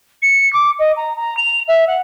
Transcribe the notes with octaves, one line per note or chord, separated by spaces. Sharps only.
C#7
D6
D#5
A#5
A#5
F7
E5
F#5